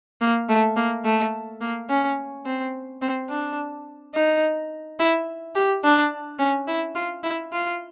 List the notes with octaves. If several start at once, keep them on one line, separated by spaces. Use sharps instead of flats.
A#3
A3
A#3
A3
A#3
C#4
C4
C4
D4
D#4
E4
G4
D4
C#4
E4
F4
E4
F4